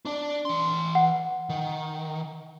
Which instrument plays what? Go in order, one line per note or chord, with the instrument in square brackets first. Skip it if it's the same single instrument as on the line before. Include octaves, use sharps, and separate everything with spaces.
[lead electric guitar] D4 D5
E3 C6
[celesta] F#5
[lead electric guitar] D#3